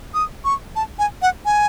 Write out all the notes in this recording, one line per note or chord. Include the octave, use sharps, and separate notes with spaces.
D#6
C#6
A5
G#5
F#5
G#5